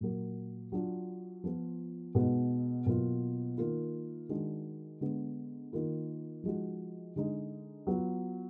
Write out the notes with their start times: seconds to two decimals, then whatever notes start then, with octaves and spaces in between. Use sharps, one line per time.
0.01 A#2 F#3 A#3
0.72 F#3 D4 F4
1.44 F3 B3 F4
2.15 B2 G#3 B3 D#4 F#4
2.86 B2 F#3 A#3 F4
3.58 D#3 A#3 F4
4.29 D#3 G#3 D4 F#4
5.01 D3 G#3 B3
5.73 D#3 A#3 F4
6.44 F3 G#3 D#4 F#4
7.16 D3 G#3 D#4
7.87 F#3 B3 F4